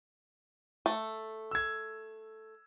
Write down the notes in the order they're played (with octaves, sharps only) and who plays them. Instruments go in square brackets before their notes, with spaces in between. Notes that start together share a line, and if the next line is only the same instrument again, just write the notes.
[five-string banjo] A3
[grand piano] E6 G#6